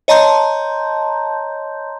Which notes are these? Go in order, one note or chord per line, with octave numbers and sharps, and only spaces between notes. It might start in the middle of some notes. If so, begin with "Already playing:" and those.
C#5 D#5 A5 A#5 C6 G6